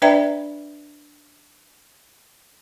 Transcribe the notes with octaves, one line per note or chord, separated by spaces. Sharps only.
D4 B4 D5 E5 G5 A#5